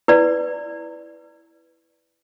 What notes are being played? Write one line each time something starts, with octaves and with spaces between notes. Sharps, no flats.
E4 B4 D5